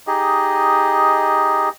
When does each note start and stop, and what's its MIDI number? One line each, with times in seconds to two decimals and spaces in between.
0.07 1.69 63
0.07 1.69 67
0.07 1.69 68
0.07 1.69 75